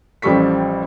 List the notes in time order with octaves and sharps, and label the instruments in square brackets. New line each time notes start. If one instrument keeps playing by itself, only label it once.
[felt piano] A1 F3 G3 A4 C#6 B6